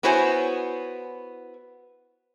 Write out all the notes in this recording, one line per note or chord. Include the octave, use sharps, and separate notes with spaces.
B3 E4 F#4 C5 C#5 G#5